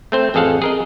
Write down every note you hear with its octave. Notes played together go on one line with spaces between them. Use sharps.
A3 C4 C5
A1 F2 G#4 A4 F5 F#5
G#4 A#4 D#5